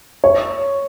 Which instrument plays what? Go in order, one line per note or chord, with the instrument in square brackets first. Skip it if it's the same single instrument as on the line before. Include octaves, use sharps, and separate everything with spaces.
[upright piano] C#5